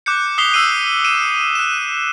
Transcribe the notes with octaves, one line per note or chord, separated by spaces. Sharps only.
D6 F#6 G6 C#7
D#6 B6 C7 F7 G7
E6 C7 D#7 G7
C#7 D#7 E7
F#6 E7